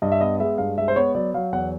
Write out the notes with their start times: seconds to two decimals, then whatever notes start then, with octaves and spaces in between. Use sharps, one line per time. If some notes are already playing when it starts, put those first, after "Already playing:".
0.02 G2 D#5
0.12 E5
0.21 B3 D#5
0.40 G#3 E5
0.58 G2 F5
0.78 G#3 E5
0.88 C5
0.96 B3 C#5
1.15 F#3 D5
1.34 F#3 F5
1.52 E2 F#5